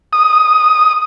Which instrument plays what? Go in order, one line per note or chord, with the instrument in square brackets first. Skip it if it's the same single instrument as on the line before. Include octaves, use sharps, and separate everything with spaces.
[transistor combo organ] D#6